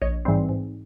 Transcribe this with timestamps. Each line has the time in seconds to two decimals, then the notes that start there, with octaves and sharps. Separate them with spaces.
0.02 A#1 C#5 D#5
0.25 G#2 E3 G3 C4
0.49 G#2